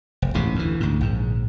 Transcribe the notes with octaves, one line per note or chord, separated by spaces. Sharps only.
F1
D#1 A1 G#2 C3
D2 E3
D2 G#2
A#1 G#2